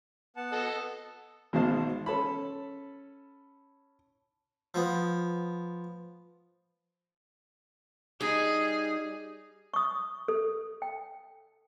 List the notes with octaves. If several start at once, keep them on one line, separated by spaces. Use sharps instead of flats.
B3 F#5 A5
A4 D#5
G#1 B2 G#3 C5 F5 A5
C#4 A4 A5 B5
F3 B3
G3 D#4 G#4
C#6 D#6
A4
G5